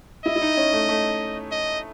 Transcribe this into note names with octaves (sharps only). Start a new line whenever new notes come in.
E4 D#5
E4
D#4
C#4
A3
A3
D#5